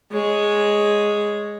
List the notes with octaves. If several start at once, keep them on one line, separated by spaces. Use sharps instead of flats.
G#3 C#5